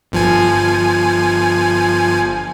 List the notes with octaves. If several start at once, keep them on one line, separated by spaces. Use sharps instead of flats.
G1 F3 G#5